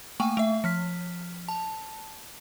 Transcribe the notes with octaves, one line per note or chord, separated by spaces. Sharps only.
A3 A#3 G5 G#5 C#6
A3 E5
F3 F6 B6
A5